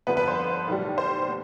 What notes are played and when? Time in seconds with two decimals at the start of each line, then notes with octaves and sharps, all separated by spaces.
0.07 G1 F2 D3 F3 B3 B4
0.17 B4
0.28 C5
0.68 B1 A2 G3
0.98 C5
1.28 B3